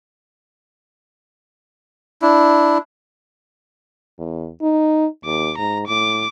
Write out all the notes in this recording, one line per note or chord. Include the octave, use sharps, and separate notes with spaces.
D4 E4
E2
D#4
D#2 D6
G#2 A#5
A2 D6